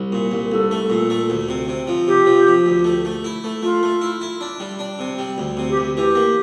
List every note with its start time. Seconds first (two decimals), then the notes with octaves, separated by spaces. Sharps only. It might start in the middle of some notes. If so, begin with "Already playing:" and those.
Already playing: C2
0.12 A#2
0.31 C2
0.51 C2 A4
0.71 A3
0.90 A#2
1.10 A3
1.30 D2
1.49 C3
1.68 C3
1.87 F3
2.07 C3 G4
2.26 F3
2.47 F3
2.66 D2
2.85 A3
3.05 A3
3.24 E4
3.44 A3
3.62 A3 F4
3.83 A3
4.01 E4
4.21 E4
4.41 D4
4.60 G3
4.79 D4
4.99 C3
5.18 G3
5.38 D2
5.57 C3
5.70 G4
5.77 D2
5.96 E3 G4
6.15 A#3